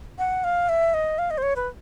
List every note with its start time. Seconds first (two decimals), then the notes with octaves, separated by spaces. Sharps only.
0.18 F#5
0.44 F5
0.69 E5
0.94 D#5
1.18 F5
1.31 D#5
1.38 C5
1.43 C#5
1.56 B4